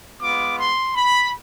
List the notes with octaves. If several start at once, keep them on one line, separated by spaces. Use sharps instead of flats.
G#3 B3 F4 D6
C6
B5